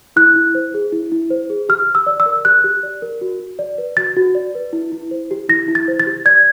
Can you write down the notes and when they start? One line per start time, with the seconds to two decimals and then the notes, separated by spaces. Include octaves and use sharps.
0.16 E4 F#6
0.36 E4
0.55 C5
0.74 G#4
0.92 E4
1.12 E4
1.30 C5
1.50 G#4
1.69 G4 F6
1.88 G4
1.95 E6
2.06 D5
2.20 E6
2.26 A#4
2.45 G4 F#6
2.64 G4
2.83 D5
3.02 A#4
3.21 F#4
3.40 F#4
3.59 D5
3.78 B4
3.97 F#4 A6
4.16 F#4
4.35 D5
4.55 B4
4.73 E4
4.92 E4
5.11 C5
5.31 G4
5.49 E4 A#6
5.68 E4
5.75 A6
5.88 C5
6.00 A6
6.07 G4
6.25 D5 G#6